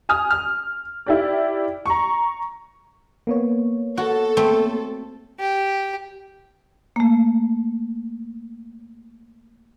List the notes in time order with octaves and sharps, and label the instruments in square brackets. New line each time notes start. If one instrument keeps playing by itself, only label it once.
[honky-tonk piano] G#5 D#6 F6
F6
E4 G4 D5
A#5 C#6
[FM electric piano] A#3 B3 C#5
[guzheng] F#4 [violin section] A4
[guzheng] A3 C4
[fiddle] G4
[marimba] A3 A#3